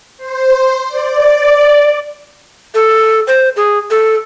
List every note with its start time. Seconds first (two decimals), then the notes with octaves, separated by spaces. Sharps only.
0.17 C5
0.88 D5
2.75 A4
3.27 C5
3.56 G#4
3.90 A4